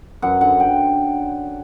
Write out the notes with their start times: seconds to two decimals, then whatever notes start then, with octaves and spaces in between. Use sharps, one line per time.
0.22 F#2 F#5
0.41 D3 F#5
0.60 G5